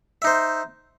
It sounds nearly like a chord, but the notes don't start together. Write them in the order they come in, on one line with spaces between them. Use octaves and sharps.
E5 D#4 C5